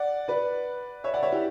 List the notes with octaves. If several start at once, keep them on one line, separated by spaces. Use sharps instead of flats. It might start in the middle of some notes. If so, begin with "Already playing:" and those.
Already playing: D5 F#5
B4 D5
C#5 E5
D5 F#5
C#5 E5
E4 G4